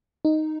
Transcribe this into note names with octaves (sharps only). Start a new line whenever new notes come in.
D#4